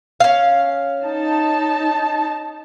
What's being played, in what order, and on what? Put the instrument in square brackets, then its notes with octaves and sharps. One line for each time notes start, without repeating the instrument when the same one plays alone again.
[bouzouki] C#4 F5
[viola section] D#4 A5